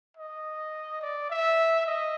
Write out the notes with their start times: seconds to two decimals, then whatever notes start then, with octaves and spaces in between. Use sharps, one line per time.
0.17 D#5
1.02 D5
1.30 E5
1.87 D#5